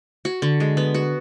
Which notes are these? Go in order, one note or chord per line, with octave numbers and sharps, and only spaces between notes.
F#4
D3
G#3
B3
F#4